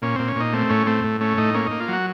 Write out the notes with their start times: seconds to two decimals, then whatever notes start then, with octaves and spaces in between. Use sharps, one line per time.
0.02 A#2 C#4
0.15 A#2 C4
0.28 C#4
0.36 A#2 D#4
0.53 A3 C4
0.69 A2 C#4
0.86 A3 C4
1.04 A2
1.21 A3 C#4
1.37 A2 D#4
1.54 A#3 C#4
1.67 A#3 D#4
1.80 F4
1.88 F#3 F#4